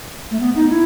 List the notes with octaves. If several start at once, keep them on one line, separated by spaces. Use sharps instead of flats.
A3
B3
D#4
E4